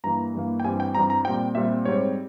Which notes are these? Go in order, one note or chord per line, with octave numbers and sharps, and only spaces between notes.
G2 E3 A#3 A#5
G2 E3 A#3
G5
G2 E3 G3 C4 G#5
G5
G2 E3 G3 C4 A#5
A#5
A#2 G3 C4 G5
A#2 G3 C4 E5
G#2 G3 C4 C#5